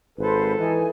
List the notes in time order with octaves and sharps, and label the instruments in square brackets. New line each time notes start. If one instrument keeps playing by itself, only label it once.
[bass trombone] G#1 [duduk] A4 [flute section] B4 C5
[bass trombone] E3 [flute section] D#4 G#5